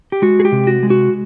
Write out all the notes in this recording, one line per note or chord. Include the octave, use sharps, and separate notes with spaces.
G4
G#3 F#4
G#4
G4
C3
F#4
G#3
F#4